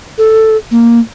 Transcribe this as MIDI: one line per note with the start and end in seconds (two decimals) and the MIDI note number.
0.18 0.57 69
0.71 1.00 58